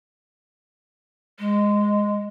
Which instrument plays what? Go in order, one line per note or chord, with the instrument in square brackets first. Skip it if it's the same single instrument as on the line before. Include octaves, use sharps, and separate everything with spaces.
[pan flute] G#3